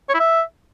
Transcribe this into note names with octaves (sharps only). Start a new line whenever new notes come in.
C#5
E4
E5